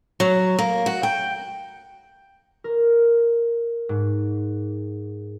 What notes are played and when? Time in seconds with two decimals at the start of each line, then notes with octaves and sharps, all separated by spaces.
0.20 F#3
0.59 A#3
0.86 F#4
1.03 G5
2.64 A#4
3.89 G#2